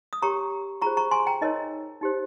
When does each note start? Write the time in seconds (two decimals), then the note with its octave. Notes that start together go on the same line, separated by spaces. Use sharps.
0.13 D#6
0.22 G4 A#4 C#5 A#5 C#6
0.82 F4 G#4 C5 A#5 C#6
0.97 A#5 C#6
1.11 G#5 C6
1.27 G5 A#5
1.41 D#4 A#4 C#5 D#5
2.01 D#4 G4 C5